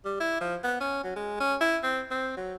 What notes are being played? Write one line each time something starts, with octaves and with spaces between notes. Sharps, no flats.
G3
E4
F3
B3
C#4
F#3
G#3
C#4
E4
C4
C4
F#3